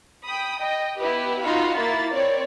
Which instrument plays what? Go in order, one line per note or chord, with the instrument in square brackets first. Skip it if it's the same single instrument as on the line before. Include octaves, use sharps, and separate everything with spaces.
[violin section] G5 B5 D#6
D#5 G5
B3 E4 G4 B4
D#4 F4 F#4 F5 B5
A#3 E4 A6
C4 C#5 D5